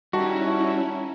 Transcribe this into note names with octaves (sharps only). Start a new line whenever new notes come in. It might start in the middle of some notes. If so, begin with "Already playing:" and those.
D#3 G3 C#4 E4 F#4 A5 D6